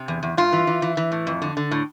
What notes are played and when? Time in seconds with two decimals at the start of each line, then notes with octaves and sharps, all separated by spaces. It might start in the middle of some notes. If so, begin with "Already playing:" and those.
Already playing: C3
0.08 E2
0.23 E2
0.37 G2 F4
0.52 E3
0.67 E3
0.82 E3
0.97 E3
1.12 A2
1.27 F2
1.42 D3
1.57 D3
1.71 A2